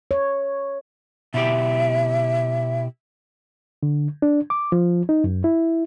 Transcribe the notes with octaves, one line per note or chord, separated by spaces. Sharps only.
C#5
B2 E4 G4 E5
D3
D4
D6
F3
D#4
F#2
E4